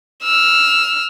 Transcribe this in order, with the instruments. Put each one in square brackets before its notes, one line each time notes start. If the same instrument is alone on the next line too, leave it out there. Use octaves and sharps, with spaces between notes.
[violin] E6 F6